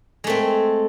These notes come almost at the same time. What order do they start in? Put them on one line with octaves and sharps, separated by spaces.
G#3 A3 C4